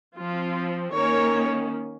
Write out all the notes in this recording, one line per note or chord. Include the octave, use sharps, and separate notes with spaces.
F3 C4 F4
D#3 A#3 C#4 A#4 C#5